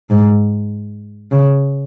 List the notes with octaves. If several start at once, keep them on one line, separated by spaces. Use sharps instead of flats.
G#2
C#3